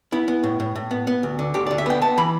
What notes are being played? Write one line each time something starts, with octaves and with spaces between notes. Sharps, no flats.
B3 E4
B3
A2
A2
A2
B3
B3
D2
D3
D2 G4
D5
D3
E5
B3 G5
B3 A5
E3 B5